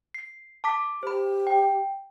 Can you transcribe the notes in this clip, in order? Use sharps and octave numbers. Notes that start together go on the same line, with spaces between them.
C7
A5 D6 B6
G4 C5 B5
G5